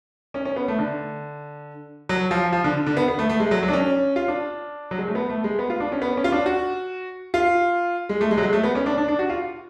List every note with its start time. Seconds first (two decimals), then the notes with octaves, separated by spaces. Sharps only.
0.34 C#4
0.45 C#4
0.56 B3
0.68 A3
0.79 D3
2.09 F#3
2.31 F3
2.53 F3
2.64 D3
2.86 D3
2.97 B3
3.08 B3
3.19 A3
3.29 A3
3.40 G#3
3.51 F#3
3.63 F#3
3.68 D4
3.73 C#4
4.16 F4
4.28 D4
4.91 F#3
4.98 G#3
5.07 A3
5.15 B3
5.30 A3
5.44 G#3
5.59 B3
5.70 F4
5.80 D4
5.92 C#4
6.02 B3
6.17 C#4
6.24 F4
6.32 D4
6.46 F#4
7.34 F4
8.09 G#3
8.21 A3
8.31 G#3
8.38 F#3
8.43 G#3
8.53 A3
8.63 B3
8.75 C#4
8.86 D4
8.97 D4
9.08 D4
9.19 F#4
9.30 F4